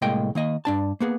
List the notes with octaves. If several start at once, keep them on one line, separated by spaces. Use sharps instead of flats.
C2 A2 G#3 A#3 D#5 G5
D#3 A#3 D#5
G2 D4 A5
A#3 B3 G#4